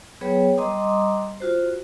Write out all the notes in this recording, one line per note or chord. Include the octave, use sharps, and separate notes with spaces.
F#3 B3 G#4 B4 C#5 G5
G3 D#5 A#5 C6 D6 D#6
F4 F#4 C5